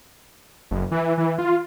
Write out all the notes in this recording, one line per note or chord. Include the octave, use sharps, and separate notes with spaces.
F#1
E3
E3
F4